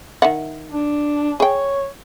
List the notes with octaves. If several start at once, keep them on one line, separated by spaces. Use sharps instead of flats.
D#3 E5 F#5
D4
G#4 C#5 G5